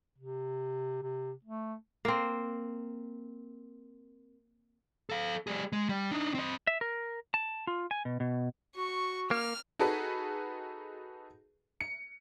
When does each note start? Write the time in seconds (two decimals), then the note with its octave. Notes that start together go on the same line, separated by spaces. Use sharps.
0.18 C3
1.02 C3
1.44 A3
2.05 A#3 C4
5.10 A4 F5
5.47 G3 G#4
5.72 G#3
5.89 G3
6.11 D4 D#4
6.35 C4 D#5
6.67 E5
6.81 A#4
7.34 A5
7.67 F4
7.91 G#5
8.05 B2
8.20 B2
8.76 F#4 C#6
9.31 A#3 F6
9.79 D#4 F#4 G#4 A4 B4
11.81 C#7